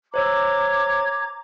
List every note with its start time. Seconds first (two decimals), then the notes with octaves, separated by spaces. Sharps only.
0.14 C5 C#5 A#5 D6 E6 G#6